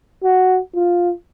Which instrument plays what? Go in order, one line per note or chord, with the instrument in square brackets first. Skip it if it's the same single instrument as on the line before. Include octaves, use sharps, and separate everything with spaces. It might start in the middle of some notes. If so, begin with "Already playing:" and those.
[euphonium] F#4
F4